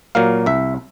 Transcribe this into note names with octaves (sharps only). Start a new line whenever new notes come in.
A#2 F#3 A#3 F5
C2 E5